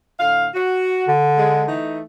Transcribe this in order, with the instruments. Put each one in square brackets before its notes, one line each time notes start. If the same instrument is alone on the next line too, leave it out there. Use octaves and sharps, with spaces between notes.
[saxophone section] A2 D3 F5
F#4
[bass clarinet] D3
[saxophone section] G#3
E3 A3 D#4